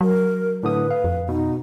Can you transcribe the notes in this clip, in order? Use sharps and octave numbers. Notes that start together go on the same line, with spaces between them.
F#3 A#4
A2 D3 B4 D#6
F5
F2
B2 D#4